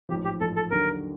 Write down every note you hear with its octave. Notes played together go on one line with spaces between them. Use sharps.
A1 G#2 F3 G4
G4
A1 G#2 F3 A4
A4
D#2 D3 F#3 A#4